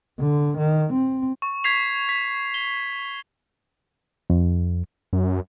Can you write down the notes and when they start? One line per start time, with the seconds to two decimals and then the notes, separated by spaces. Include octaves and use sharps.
0.19 D3
0.58 D#3
0.93 C4
1.42 C#6
1.64 G#6 B6 C7 F7
2.09 B6
2.54 G7
4.30 F2
5.13 F#2